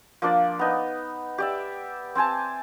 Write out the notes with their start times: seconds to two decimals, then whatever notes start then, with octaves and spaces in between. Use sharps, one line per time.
0.22 F3 A#3 D4 D5
0.59 B3 D#4
1.38 G4 D5 E5
2.15 C4 C5 G#5 A5